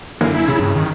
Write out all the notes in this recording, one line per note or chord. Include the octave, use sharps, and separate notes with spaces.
F#2 D3 E3 A#3
E4
C#3
G2
D#3